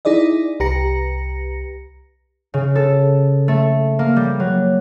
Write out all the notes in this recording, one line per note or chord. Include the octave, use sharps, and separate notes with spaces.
D#4 E4 G#4 D5 D#5
C2 G4 B4 A#5 A#6 C#7
C#3
A4
A3
A#3
G3
F#3